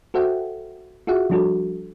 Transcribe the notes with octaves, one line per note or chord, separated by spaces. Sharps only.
F#4 A4 C5 E5 F#5 G5
F4 F#4 G#4 E5 F#5
F3 G3 D4 F#4 A4